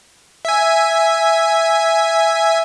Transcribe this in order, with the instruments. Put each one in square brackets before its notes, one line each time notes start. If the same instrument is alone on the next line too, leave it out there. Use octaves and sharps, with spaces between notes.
[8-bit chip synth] E5 G#5